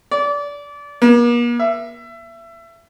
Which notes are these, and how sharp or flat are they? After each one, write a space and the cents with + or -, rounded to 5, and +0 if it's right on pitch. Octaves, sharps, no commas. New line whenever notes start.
D5 -25
A#3 +45
E5 +25